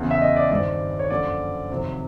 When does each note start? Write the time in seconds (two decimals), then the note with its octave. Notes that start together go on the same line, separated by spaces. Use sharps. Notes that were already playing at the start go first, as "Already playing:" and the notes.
Already playing: E2 C#3 E3
0.11 E5
0.22 D#5
0.36 D5
0.50 G2 D#3 G3 C4 D5
0.99 C#5
1.10 F#2 D3 F3 A#3 D5
1.70 F2 C3 D#3 F#3